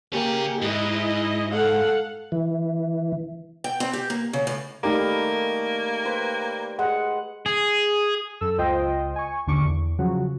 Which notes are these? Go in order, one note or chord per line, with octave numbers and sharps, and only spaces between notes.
A#3 C#4 G4 G#4
G#2 E4 D#5
A4 F5 F#5
E3
G5
C4
G4
A#3
C#3
A2
G3 A3 A#3 D#4 A#4
B4 C5
G#3 F#5
G#4
F#2 A4 E6
C#2 F4 C5 D#5 G5
G#5 C#6
A#1 D#2 D3 D4 C#6 D6
E2
C#3 F3 F#3 F#4